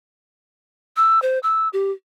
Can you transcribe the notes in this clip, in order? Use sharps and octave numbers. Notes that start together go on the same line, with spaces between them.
E6
C5
E6
G4